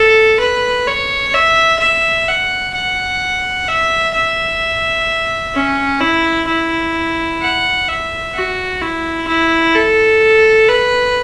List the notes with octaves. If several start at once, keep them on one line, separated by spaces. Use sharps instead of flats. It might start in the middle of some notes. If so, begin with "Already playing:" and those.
Already playing: A4
B4
C#5
E5
E5
F#5
F#5
E5
E5
C#4
E4
E4
F#5
E5
F#4
E4
E4
A4
B4